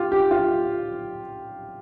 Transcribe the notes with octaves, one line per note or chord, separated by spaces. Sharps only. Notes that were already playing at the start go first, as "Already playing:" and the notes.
Already playing: F4 G4
G4
F4